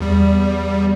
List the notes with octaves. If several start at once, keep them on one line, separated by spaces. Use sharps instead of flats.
E2 G3